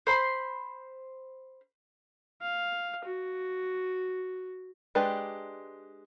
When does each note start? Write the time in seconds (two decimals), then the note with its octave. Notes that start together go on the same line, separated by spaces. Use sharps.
0.07 C5 B5 C6
2.42 F5
3.05 F#4
4.95 G#3 D4 G4 B4 D5